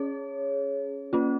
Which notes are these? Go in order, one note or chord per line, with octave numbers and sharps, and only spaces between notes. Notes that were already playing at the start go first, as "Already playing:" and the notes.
Already playing: C#4 G#4 C#5
A#3 C#4 F4